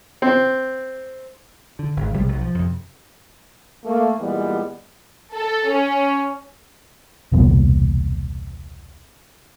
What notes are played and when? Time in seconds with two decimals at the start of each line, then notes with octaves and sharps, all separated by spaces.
0.22 C4
1.79 D3
1.97 G#1 G#2
2.14 A#1 C3 G3 G#3
2.29 B1 F#3
2.41 F3
2.55 F2 C3
3.85 A3 A#3
4.19 A#2 E3 G3 G#3 B3
5.34 A4
5.69 C#4
7.32 E1 C2 A#2 B3